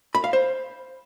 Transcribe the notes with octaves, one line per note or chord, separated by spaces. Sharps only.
B5
F5
C5